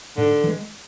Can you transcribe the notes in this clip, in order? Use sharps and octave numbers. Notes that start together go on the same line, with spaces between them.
G#2 D3
E3 G#3